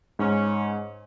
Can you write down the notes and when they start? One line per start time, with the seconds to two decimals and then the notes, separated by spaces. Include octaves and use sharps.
0.19 G#2 C#4